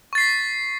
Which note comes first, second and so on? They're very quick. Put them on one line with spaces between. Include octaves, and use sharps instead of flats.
C#6 A6 C7 B6